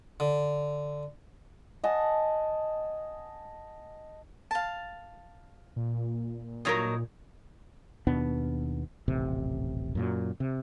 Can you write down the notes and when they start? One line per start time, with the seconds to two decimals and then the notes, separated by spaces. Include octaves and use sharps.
0.20 D3
1.84 D#5 F#5 G#5 A5
4.51 F5 A5
5.76 A#2
6.65 G2 F#3 D#4 A#4 C#5 D#6
8.07 D#2 B2 B3 D4
9.08 D#1 A1 C3
9.95 F#2 A#2 F#3
10.40 C3